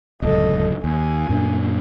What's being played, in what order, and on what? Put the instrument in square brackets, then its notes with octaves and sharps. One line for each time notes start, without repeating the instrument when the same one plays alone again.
[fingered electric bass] D1 C#2 F#2 [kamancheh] A4 D#5
[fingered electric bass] D#2 [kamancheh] G#5
[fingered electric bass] F#2 A#2 D4